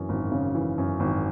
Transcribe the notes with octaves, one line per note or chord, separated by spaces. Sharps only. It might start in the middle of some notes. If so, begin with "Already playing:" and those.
Already playing: F#2 E3
G#1
C#3
E3
F#2
G#1